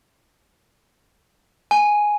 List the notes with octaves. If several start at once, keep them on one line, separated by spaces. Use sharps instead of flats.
G#5